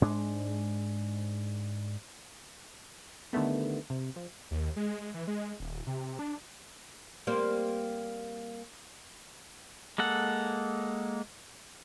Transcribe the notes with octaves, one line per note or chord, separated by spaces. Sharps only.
G#2 G#3 D4
D3 D#3 G3 A3 B3
C3
F3
D#2
G#3
E3
G#3
D#1
C3
D4
G3 A#3 C4
G#3 A#3 A4 F#5